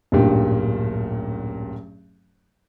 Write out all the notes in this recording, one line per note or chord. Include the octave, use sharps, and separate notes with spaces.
D1 A1 G2 A#2 G4